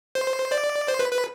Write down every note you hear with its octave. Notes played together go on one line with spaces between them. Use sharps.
C5
D5
C5
B4
B4